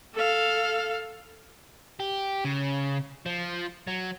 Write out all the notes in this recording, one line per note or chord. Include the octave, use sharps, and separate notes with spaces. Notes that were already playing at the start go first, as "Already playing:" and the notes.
A4 F5
G4
C#3
F3
F#3